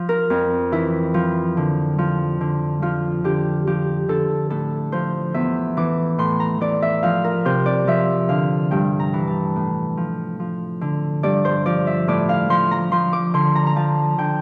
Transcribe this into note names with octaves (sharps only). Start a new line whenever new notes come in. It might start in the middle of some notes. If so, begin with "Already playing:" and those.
Already playing: F3
A#4
F2
E3 E4
F3
D3
F3
D3
F3 F4
D3 G4
F3 G4
D3 A4
A2 A4
F3 C5
E2 E5
E3 D6
A2 C6
A#5
E3 D5
E5
F3 F5
A#4
C3 C5
D5
F3 E5
D3 F5
G2 G5
A#5
E3
A5
A2
F3
F3
D3
G2 D5
C5
F3 D5
E5
A2 D5
F5
F3 C6
A#5
F3 C6
D6
D3 C6
A#5
A#5
F3 A5
D3 G5